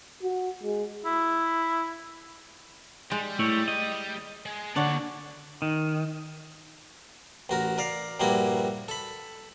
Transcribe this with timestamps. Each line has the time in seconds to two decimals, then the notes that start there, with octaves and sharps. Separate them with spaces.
0.23 F#4
0.63 G#3
1.05 E4
3.11 G3 G#3
3.39 A3 E4 C#5
3.68 D#5
4.46 G#3
4.76 D3 A#3 D4 F#4 C#5 A5
5.62 D#3
7.49 A1 F#4 A#4
7.78 A#4 D5 F5
8.20 A#1 G2 G3 A#3 E4 F#4
8.88 A4 B5